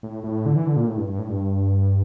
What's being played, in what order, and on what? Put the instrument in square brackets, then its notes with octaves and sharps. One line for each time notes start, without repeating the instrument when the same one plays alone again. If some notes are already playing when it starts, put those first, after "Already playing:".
[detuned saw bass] A2
A2
D3
E3
D3
A#2
A2
G2
G2
A2
G2